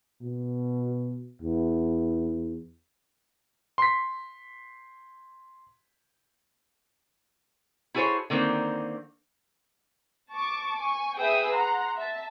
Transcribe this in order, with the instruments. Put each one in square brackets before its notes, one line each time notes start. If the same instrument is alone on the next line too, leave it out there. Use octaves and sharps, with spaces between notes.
[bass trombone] B2
E2
[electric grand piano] C6 B6
[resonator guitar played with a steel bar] E4 F#4 G#4 A4 C5 C#5
D3 D#3 A#3 C4
[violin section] A5 C#6 D6
G#5 C#6
G#4 B4 E5 G5 D#6 E6
F#5 A#5 C6
E5 A5